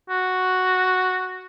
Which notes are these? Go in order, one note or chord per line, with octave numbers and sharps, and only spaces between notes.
F#4